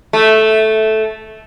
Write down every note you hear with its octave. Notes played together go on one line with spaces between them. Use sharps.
A3